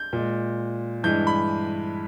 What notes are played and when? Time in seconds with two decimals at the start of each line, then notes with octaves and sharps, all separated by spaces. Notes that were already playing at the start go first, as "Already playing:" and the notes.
Already playing: G6
0.13 A#2 G#3
1.03 G2 E3 G#3 G6
1.27 B5